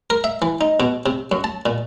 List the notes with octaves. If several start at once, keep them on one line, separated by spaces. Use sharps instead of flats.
A#4
E5
E3
D#4
B2
C3
F#2
A5
A#2